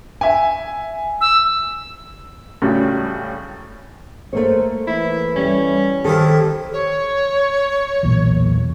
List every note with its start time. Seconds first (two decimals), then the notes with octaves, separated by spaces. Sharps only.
0.21 E5 G#5
1.21 E6
2.62 A2 C#3 F#3 G3
4.33 A3 A#3 C5 C#5
4.87 E3 E4
5.36 G3 C#4
6.05 D#3 F3 E4 G4 A4
6.73 C#5
8.03 B1 E2 A#2